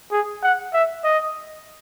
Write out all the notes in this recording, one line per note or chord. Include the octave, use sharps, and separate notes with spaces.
G#4
F#5
E5
D#5